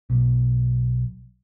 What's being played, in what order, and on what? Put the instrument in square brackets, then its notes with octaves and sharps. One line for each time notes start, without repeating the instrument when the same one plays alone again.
[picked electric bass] B1